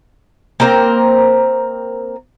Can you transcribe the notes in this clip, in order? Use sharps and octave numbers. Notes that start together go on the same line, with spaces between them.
A#3 C4 A#4 C5